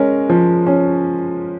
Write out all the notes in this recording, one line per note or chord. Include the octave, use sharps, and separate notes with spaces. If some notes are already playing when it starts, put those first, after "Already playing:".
Already playing: G#3 C#4 A#4
F3
C#4